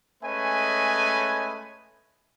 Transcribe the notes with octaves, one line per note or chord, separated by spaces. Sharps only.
G#3 A3 C#4 B4 D#5 G#5